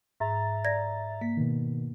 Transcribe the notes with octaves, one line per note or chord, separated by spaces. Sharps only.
G#2 E5 A#5 A6
D5 G#6 A#6
A#3 B6
B2 D#3